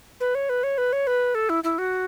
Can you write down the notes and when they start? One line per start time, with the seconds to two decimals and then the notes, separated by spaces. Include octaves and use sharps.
0.20 B4
0.35 C#5
0.49 B4
0.63 C#5
0.78 B4
0.93 C#5
1.07 B4
1.35 A4
1.49 E4
1.64 E4
1.78 F#4